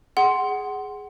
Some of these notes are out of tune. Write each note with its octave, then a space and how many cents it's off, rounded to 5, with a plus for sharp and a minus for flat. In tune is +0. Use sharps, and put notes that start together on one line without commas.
G#4 +0 F#5 +20 C6 +0